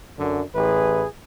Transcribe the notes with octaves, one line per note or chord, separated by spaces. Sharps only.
F#2 D3
A1 E4 G#4 B4